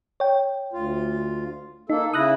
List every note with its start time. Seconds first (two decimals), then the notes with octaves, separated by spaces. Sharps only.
0.20 C#5 G5
0.73 D2 F4
1.90 A#3 D#4 A4
2.13 C#3 E4 D#6 F#6 A#6